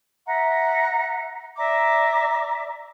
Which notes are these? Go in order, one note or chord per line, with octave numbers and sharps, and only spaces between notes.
E5 F#5 A#5
D5 E5 A#5 D6